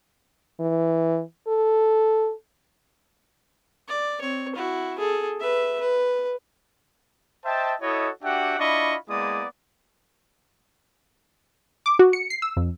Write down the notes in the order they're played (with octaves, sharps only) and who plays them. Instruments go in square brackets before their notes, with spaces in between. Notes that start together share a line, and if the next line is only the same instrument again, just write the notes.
[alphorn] E3
A4
[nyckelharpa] D5
C4 C#5
E4 F#4
G#4 A4
B4 E5
B4
[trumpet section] C5 D#5 E5 G5 A5
E4 F#4 A4 C#5 D#5
D4 F#4 G4 E5 F#5 G5
D4 E4 F4 D#5 B5 C#6
G#3 A#3 B3 E4 D5 D#6
[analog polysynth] D6
F#4
C#7
C7
E6
F2